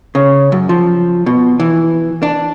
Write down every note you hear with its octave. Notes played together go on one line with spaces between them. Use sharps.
C#3
F#2
F3
B2
E3
D4